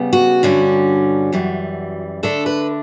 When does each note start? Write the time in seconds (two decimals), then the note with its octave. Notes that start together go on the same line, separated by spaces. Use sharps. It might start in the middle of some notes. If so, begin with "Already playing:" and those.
Already playing: C#3 G3 B3
0.13 F#4
0.43 G2 D3 G3 C#4
1.32 F#2 E3 G3
2.23 D3 A3 D4 A4
2.46 B4